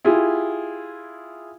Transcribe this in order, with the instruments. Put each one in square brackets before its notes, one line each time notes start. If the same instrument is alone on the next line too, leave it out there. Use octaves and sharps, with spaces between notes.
[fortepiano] E4 F4 G4 G#4